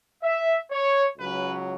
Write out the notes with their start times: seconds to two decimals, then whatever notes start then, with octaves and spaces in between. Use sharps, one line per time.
0.23 E5
0.71 C#5
1.18 C#2 C#3 F#3 B4